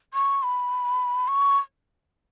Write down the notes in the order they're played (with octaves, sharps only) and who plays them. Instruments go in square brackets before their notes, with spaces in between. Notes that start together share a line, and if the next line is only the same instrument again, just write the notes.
[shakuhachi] C#6
B5
C#6